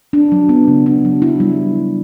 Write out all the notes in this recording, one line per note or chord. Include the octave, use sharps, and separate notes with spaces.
D4
F#3
B3
C#3
D4
F#3
E4
G3